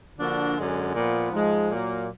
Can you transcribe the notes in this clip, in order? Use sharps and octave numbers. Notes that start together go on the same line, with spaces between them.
D3 F3 A#3 D4 F#4
F#2 D3 G#3
A#2 F3 B3
G#2 F3 G#3
A#2 F#3 A#3